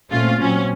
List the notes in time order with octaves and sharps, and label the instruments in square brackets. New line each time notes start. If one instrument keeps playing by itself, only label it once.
[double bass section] A#2 A3 C4 [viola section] C#4 F4
[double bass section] A#2 F#3 C4 [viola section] C#4